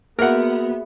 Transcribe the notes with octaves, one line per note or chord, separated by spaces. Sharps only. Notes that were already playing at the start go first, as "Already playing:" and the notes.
A#3 B3 F#4 G#4 A#4 E5 F#5